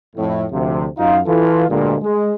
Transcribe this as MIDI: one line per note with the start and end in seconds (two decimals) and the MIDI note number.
0.16 0.45 41
0.16 0.45 45
0.52 0.86 38
0.52 0.86 48
0.52 0.86 53
0.98 1.18 42
0.98 1.18 63
0.98 1.18 65
0.98 1.18 77
1.27 1.66 52
1.27 1.66 65
1.27 1.66 69
1.69 1.95 38
1.69 1.95 43
1.69 1.95 46
1.69 1.95 56
2.02 2.33 56